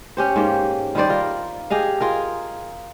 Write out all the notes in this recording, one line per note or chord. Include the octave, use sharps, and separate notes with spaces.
C#4 G4 C5
G#2 A#3 G4
D#3 G3 C5 D5
F4 A#4
G4 G#4 D#5 F5
F4 G#4 A#4